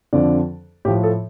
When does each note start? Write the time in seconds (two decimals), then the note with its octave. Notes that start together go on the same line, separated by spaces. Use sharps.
0.13 F2 D3 F3 D5
0.85 A2 F3 G4
1.03 A4